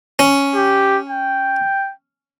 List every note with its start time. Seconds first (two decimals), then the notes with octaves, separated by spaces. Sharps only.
0.19 C#4
0.55 G4
1.10 G5